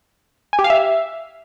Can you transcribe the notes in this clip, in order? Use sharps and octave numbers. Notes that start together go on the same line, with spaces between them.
G#5
G4
F5
E5